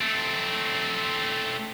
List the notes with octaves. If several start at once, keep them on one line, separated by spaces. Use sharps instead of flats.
A3 C4